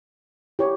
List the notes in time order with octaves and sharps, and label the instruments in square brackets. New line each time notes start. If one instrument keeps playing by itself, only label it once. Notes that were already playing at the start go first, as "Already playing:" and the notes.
[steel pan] E4 G4 C#5